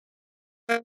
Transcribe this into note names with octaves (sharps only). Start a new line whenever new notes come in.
A#3